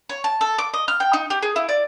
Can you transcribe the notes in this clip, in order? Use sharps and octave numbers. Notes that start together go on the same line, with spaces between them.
C#5
A5
A4
D6
D#5
F6
G5
D#4
G4
G#4
E4
D5